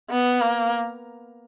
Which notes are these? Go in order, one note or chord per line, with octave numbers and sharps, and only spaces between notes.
B3
A#3